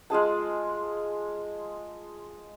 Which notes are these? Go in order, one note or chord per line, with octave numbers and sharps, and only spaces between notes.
G#3 F4 G#4 A5